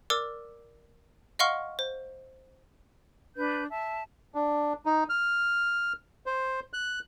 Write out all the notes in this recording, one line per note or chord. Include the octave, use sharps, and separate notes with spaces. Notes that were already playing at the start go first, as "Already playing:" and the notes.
A#4 D5 D6 E6
D#5 F5 F#5 C6 C#6 F6
C5
D4 B4 G6
E5 A5
D4
D#4
F6
C5
F#6